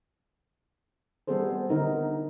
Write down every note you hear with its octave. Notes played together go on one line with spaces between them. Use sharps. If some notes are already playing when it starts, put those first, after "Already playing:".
G3 B3 F4 G#4 A4 C5
D3 B3 D#4 A#4